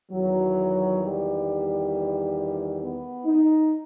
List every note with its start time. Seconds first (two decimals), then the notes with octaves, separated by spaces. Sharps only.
0.11 E2 D#3 F#3
1.01 G3
2.81 B3
3.26 D#4